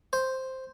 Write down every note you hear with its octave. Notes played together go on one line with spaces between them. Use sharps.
C5